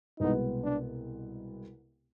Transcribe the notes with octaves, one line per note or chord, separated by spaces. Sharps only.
C2 B2 G#3 B3 D#4
D4